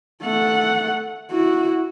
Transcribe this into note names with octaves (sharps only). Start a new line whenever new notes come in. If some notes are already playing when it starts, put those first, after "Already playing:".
A3 F#5
E4 F#4